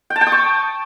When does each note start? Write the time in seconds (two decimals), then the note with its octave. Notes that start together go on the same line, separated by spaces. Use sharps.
0.10 G5
0.16 A5
0.21 G5
0.27 D#6
0.32 C#6